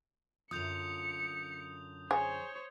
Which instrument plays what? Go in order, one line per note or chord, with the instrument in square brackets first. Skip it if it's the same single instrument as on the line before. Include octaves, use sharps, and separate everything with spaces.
[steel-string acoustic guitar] F#2 D3 F4 [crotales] D#6 G6 F7 [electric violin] C#7
[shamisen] G#4 [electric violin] C5 C#5